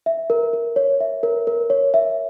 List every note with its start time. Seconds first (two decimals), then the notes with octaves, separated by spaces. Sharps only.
0.06 E5
0.30 A#4
0.53 A#4
0.76 C#5
1.00 E5
1.23 A#4
1.47 A#4
1.70 C#5
1.94 E5